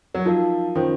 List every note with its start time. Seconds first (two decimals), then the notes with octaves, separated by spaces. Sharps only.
0.15 F#3
0.25 F3 D#4 A#4 F5 A5
0.75 D#3 C#4 F4 C5